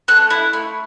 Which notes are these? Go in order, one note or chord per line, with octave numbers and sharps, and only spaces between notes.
A3 F#6
E4
A3